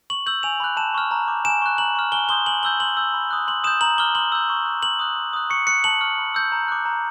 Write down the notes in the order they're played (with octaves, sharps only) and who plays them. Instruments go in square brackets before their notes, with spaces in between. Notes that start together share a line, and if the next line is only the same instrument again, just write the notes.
[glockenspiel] C#6 F#7
E6 G6 F#7
G#5 F7
B5 D6 F#6
A5 E7
C#6 F6
A#5
D6 G6
G#5 E7
C#6 F#6
A#5 F#7
C#6 F6
G#5 G7
C6 D#6 G6 G7
G#5 F#7
B5 E6 G6 G7
C6 F#7
E6 G6
B5
D#6 F#6
C6 F#7
D#6 G6 E7
A#5 F#7
D6 F6 G7
C6 F#7
E6 G6
C#6
F#6
C6 F#7
D#6 F#6
C6
D#6 F#6
C#6 C#7
F#6 C#7
A5 F#7
C#6 F6
B5
E6 G6
A#5
D6 F#6
A#5